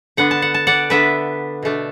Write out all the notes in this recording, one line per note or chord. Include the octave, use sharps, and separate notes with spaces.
D3 B3 D4 F#5
A5
F#5
A5
D5 F#5
D3 B3 D4 B4 E5
B2 A3 D4